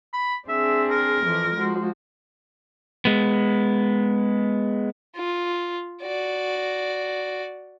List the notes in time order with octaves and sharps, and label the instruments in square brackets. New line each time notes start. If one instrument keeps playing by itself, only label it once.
[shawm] B5
[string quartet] C4 D4 G#4 [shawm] E5
[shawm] A#4
[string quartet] F2 E3 F3
F3 G#3 F#4
[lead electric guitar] G#3 B3
[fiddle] F4
F#4 D5